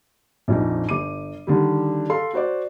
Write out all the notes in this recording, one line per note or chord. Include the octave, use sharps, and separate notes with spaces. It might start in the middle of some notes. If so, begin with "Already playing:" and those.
A#1 F2 D#4
G1 D6 D#7
D3 D#3 G3
A4 F5 C6
F#4 C5 D5